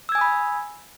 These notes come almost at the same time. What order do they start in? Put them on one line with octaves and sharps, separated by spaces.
E6 G#6 G#5 D#6 B5